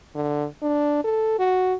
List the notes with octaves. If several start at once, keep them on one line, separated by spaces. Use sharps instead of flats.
D3
D4
A4
F#4